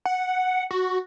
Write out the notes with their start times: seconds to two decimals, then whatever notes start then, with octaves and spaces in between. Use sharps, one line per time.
0.06 F#5
0.71 F#4